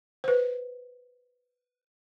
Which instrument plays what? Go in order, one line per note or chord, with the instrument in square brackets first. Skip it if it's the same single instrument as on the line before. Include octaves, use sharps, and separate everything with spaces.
[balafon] B4 C5